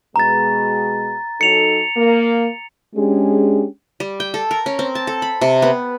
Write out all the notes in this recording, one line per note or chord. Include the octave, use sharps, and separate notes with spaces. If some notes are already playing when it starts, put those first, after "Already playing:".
B2 G#3 A#5 A6
F#3 D#4 A4 C#7 F7
A#3
G#3 C#4 D4 G4 G#4
G3
G5
A4
A#4
C#4
C4
A5
A4
B5
C3
B3